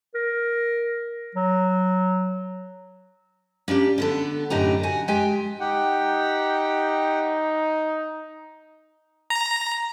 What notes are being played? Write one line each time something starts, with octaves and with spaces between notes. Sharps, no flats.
A#4
F#3
A#3 C#4 D4 G4
D3 B3 A4
F#2 A2 D3 D#4 G4 A#5
F#4 F#5 G#5
G#3 G4 G5 G#5
D#4 G4 F#5 G5
A#5